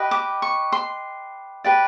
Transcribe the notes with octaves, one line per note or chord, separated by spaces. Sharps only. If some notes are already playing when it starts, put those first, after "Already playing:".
Already playing: G4 B4 D#5
D6
C#6
C6
G4 B4 D5